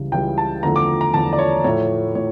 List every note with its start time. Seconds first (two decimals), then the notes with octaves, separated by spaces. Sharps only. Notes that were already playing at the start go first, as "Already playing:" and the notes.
Already playing: C#2 C#3 E3 G3
0.12 C#2 C#3 E3 G3 G5
0.38 A5
0.63 E2 D3 F3 A3 A#5
0.76 D6
1.01 A#5
1.14 E2 D3 F3 A3 A5
1.33 D5
1.39 C#5
1.64 A2 F3 A3 C#5
2.15 A2 C#5